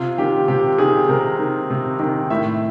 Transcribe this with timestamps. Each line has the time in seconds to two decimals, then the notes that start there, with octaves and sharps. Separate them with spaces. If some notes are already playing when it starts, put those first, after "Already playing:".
Already playing: C3 F4
0.18 D#3 G4
0.48 C3 G4
0.78 D#3 G#4
1.09 C3 A#4
1.39 D#3
1.70 C3
1.99 D#3
2.30 A2 E5